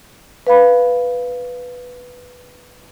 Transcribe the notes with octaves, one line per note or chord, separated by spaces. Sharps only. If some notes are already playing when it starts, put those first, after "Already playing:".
B4 F5 B5